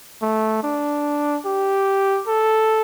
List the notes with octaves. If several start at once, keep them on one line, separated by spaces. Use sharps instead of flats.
A3
D4
G4
A4